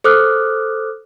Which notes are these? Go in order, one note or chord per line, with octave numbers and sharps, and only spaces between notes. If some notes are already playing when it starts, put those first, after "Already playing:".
A4 C5 D6 D#6 F6 F#6